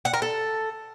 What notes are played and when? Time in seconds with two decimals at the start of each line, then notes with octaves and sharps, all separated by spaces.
0.05 F#5
0.14 A#4
0.22 A4